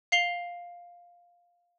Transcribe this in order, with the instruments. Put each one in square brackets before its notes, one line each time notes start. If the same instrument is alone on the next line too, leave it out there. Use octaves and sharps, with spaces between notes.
[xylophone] F5 C7 F7 G7